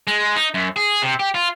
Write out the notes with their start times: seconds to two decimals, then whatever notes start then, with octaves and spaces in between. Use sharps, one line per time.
0.07 G#3
0.36 D#4
0.54 F#2
0.76 G#4
1.02 C3
1.19 G4
1.34 F4